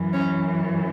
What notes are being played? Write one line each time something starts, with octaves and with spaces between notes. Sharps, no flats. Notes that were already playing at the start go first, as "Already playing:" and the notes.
Already playing: F#2 E3
C#4